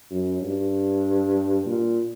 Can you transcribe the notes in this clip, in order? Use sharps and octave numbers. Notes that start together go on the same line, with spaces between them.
F#2
G2
A#2